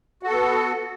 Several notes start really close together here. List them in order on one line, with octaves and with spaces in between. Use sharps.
F#4 A4 B3